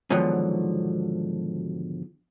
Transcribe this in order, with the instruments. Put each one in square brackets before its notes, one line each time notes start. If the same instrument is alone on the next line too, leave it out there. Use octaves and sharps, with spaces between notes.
[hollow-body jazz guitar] G#2 B2 D3 D#3 F3 F#3